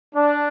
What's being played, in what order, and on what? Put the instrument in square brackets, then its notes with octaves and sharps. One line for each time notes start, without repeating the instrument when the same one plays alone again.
[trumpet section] D4